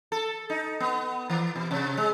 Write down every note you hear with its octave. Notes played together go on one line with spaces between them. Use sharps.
A4
D#4
B3
E3
B2
C3
G#3